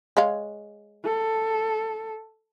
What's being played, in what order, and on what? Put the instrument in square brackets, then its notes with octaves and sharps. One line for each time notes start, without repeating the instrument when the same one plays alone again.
[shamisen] G#3 C#5 F5
[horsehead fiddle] A4